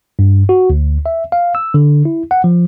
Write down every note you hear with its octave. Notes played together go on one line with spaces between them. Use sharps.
G2
F#4
D2
E5
F5
E6
D3
E4
F#5
F3